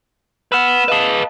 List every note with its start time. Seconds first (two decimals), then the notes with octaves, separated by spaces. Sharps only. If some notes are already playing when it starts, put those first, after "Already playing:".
0.52 B4 F#5 B5 E6 F6 E7
0.88 G#4 B4 D#5 F5 A5